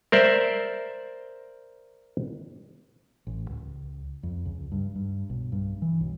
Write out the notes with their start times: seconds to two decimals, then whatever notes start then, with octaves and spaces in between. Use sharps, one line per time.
0.12 A#4 C5 D5 E5
3.27 A1
3.50 C#2
4.23 F2
4.45 C#2
4.72 G2
4.95 G2
5.30 B1
5.52 G2
5.82 E3
6.01 B1